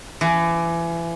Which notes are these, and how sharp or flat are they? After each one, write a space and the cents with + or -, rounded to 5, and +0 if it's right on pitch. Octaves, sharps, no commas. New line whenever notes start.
E3 +30